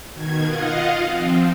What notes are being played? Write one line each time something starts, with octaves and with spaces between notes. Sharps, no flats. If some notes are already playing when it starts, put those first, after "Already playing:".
B2 D#3 G#6
F4 D#5 F5 F#5
F3 C4